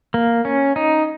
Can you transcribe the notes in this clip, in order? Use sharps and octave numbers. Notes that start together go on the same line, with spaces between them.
A#3
C#4
D#4